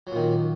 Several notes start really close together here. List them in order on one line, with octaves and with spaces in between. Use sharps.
F#3 A#2 D#3